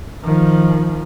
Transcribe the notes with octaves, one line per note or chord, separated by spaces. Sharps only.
D#3 F3